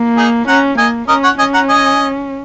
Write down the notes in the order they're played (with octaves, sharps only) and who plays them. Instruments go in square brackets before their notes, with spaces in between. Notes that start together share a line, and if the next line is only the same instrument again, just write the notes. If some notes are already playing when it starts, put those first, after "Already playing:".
Already playing: [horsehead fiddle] A#3
[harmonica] D#4 G#4
[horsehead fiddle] C#4 [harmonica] F#5 A#5
[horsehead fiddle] A#3 [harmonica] D#5 G#5
[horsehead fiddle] C#4 [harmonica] A#4 D#5
[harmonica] C#5 F#5
[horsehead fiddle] C#4 [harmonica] D#5 G#5
[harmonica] F#5 A#5
D#5 G#5